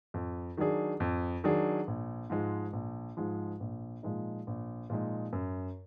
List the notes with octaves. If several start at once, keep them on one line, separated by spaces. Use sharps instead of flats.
F2
D#3 F#3 D4 G#4
F2
D#3 F#3 D4 G#4
A#1
G#2 F3 G#3
A#1
G#2 F3 G#3
A#1
A#2 F3 G#3 D#4
A#1
A#2 F3 G#3 D#4
F#2